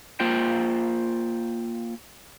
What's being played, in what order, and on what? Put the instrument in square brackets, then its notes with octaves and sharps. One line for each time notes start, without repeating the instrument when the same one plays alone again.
[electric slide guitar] A#3 F4 C5 G5